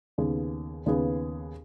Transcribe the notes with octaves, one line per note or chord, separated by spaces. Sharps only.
D#2 C#3 B3 G#4 B4
D#2 C#3 B3 G#4 B4